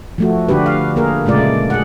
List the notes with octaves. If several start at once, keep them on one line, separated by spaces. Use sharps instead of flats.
F3 A3 F#4
D3 D4 F#4 G4 B4
F5
A#3 G#4 A#4
A#2 C#3 G#3 A3 F4 D5
G#4 F#5